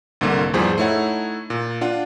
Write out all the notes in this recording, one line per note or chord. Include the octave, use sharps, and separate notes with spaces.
C2 G#2 D3 A#3
E2 G#2 F3 G3 G#4 C5
A3 D#4 E4 C#5 F#5
A#2
D4 F4 F#5